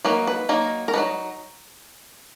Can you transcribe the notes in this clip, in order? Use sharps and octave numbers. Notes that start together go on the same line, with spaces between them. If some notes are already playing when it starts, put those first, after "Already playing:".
F#3 A#3 D#4 B4
B4
F#3 A#3 D#4
A#4
F#3 A#3 D#4 B4